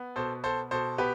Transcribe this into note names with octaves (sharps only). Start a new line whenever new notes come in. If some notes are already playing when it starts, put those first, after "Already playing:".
Already playing: B3
B2 A4 C5
B3 A4 C5
B2 A4 C5
B3 G4 B4